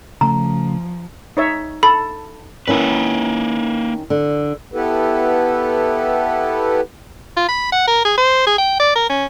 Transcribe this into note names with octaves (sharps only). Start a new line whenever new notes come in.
C#3 F3 A3 A#5
D#4 C#5 E5
A4 B5
D#3 A#3 C#4 E4 B4
D3
B3 E4 G4 A4 B4
F4
B5
F#5
A#4
G#4
C5
G#4
G5
D5
A#4
C#4